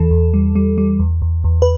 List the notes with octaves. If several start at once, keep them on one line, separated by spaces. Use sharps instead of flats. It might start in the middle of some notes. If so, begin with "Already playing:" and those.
Already playing: E2 E3 A4
E2
G3
G3
G3
E2
E2
E2
B4